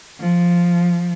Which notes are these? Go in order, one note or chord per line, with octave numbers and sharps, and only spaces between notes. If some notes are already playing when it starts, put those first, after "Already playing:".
F3